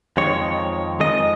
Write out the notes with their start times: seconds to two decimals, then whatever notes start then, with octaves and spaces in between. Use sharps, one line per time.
0.17 F2 D#3 G#3 C#5
1.00 F2 D#3 G#3 D#5